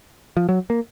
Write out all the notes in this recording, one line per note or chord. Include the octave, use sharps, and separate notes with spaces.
F3
F#3
A#3